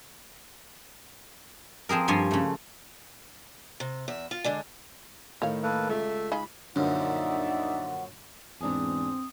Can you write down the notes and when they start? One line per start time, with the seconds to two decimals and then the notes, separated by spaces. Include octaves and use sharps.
1.89 F3 C4 G#4 A#4
2.08 G2 F3 C#5 G#5 C6
2.31 C#3 A3
3.80 C3
4.08 E2 E5
4.31 F4
4.44 D3 G#3 D4
5.42 A2 D#3 C#5 F5
5.63 A#3 A4 B4
5.89 C#2 A3 E5
6.32 D#4 F4 G#4 B5
6.76 A#1 F#2 D3 D#4 D5 E5 F#5
8.61 E2 G#2 C4 D4 G#5 D#6